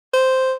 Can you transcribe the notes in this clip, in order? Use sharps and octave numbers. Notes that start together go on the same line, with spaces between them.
C5